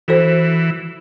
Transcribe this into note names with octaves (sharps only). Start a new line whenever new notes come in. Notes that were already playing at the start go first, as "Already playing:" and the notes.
E3 F#4 A4 C5